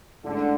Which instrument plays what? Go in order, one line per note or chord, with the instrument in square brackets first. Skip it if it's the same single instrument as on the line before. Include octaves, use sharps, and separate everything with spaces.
[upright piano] A1 G#2 G#3 [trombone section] D3